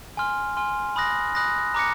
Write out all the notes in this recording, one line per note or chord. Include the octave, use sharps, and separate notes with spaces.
G#5 C6 F6
G#5 C6 F6
B5 D#6 F#6 A#6
B5 D#6 F#6 A#6
A#5 D6 F#6 A#6 C#7